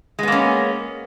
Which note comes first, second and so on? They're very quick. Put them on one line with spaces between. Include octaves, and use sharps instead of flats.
G#3 B3 A#3 C#4